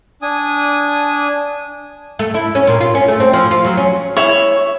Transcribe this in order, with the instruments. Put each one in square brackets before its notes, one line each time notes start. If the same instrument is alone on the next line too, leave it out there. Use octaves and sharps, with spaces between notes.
[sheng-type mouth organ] D4 G#5 D#6
[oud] A3
E4
C#4
A#2
F4
C#4
A3
C4
F3
F4
F#3
C#4
[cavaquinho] E4 C#5